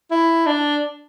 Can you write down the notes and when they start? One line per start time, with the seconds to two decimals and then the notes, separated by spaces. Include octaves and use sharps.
0.11 E4
0.46 D4